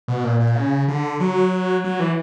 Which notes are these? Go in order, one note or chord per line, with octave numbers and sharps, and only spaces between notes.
B2
A#2
A#2
C#3
D3
F#3
F#3
E3